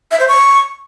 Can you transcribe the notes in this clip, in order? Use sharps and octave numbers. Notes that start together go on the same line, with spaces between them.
E5
C5
C#6